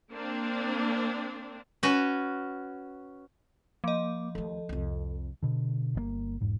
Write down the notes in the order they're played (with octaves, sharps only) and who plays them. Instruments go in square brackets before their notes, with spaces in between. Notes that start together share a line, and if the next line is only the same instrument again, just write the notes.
[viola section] A#3 C4 D4
[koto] C#4 F#4 B4
[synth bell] F3 D#5 [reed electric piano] A#3 D6
[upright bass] D#2 A3 [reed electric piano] A4
[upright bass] C2 F2
[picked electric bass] B2 D3
G1 C3 A#3
E1 G#2